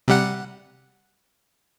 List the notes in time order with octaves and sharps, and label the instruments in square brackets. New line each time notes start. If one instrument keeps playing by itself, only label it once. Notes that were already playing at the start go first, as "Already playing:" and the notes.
[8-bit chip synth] C3 G3 F#5